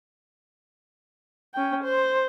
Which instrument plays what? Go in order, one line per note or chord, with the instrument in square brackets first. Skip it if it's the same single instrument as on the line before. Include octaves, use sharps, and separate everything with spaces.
[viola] C#4 G5
C5